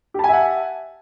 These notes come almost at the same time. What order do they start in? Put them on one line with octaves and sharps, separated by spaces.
G4 A5 G#5 E5 F#5